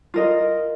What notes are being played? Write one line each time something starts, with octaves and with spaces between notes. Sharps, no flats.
F4 A#4 D#5